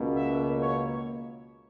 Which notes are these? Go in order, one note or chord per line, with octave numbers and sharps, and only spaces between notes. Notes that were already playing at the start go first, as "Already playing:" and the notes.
Already playing: C#2 B2 A#3
E5
C#5